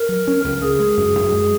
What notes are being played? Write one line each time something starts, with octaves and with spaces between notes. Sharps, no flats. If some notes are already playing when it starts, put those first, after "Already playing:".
Already playing: A#4
F#3
C#4
C#2
C#3 G#4
G#3
F#2
F#2
G#3